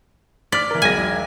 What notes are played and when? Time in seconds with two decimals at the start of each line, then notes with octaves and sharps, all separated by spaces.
0.52 D5 F6 B6
0.71 E3 A#4
0.82 E1 B1 G#5 A#6